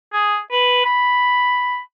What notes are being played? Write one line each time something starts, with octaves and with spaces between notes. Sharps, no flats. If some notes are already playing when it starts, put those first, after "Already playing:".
G#4
B4
B5